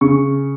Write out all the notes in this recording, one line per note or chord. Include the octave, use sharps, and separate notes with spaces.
C#3 C#6